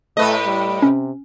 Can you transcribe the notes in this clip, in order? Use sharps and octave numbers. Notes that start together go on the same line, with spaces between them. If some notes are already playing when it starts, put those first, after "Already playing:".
A2 A3 B4 D#5
G3
C3 C#4